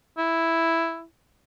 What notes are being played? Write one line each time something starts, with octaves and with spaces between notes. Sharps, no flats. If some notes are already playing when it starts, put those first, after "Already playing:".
E4